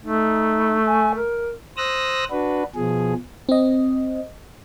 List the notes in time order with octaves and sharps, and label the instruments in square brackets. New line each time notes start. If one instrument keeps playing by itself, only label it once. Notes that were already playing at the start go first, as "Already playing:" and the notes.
[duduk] A3 [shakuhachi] D#4
[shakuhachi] G#5
A#4
[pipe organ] C5 D#6 E6 F#6 A#6
D4 F#4 B4
B2 F3 G#4
[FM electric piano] C4 D#5